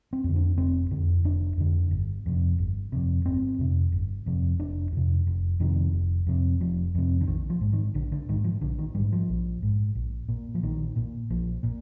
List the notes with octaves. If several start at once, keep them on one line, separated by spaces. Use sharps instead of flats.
C4
F2 D3
D4
F1 C4
F2 D3
F1 D4
F2 D3
G1
F2 C3
G1
F2 C3
G1 C4
F2 C3
G1
F2 C3
F1 D4
F2 C3
F1
F2 C3 D#3
F1
F2 C3
F1 F3
F2 C3
D3
A#1 D#3
F3
G#2
D#3
A#1 D3
D3
G#2 D#3
F3
A#1 D3
D#3
G#2 G3
F3
A#1
G#2
A#1
A#2
F3
A#1 D#3
A#2
A#1 F3
A#2